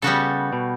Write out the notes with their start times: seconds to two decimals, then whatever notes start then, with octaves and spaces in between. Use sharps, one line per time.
0.02 C#3 G3 B3 F#4 A4
0.53 B2